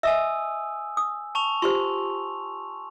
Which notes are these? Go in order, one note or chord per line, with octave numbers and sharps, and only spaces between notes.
D#5 E5 G#5 D#6 E6
D#6
A5 C#6 F7
F4 G4 C5 C6